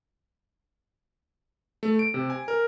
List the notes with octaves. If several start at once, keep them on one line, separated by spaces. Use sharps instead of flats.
A3
D7
C3
G#5
A#4